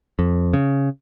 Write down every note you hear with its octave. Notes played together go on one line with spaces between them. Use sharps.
F2
C#3